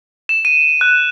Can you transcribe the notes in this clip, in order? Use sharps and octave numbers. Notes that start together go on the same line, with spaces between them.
E7
D#7
F#6